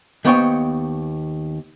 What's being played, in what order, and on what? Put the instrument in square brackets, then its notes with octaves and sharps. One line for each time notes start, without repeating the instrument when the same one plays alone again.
[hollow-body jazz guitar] D#2 B3 C5 C#5 F#5 G5